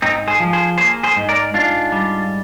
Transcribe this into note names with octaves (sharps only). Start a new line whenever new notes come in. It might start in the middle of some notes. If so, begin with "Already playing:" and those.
G#2 C4 D#4
G#4 C5
F3
G#4 C5
A#3 G#4 C5
G#4 C5
G#2
A#4 D5
G#2 D4 F4
G3